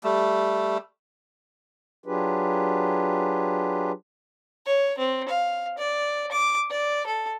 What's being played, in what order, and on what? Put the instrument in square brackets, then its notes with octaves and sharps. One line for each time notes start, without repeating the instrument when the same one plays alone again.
[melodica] G3 A3
[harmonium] F#3 D4 F4 G4 G#4 B4
[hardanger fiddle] C#5
C4
F5
D5
D6
D5
A4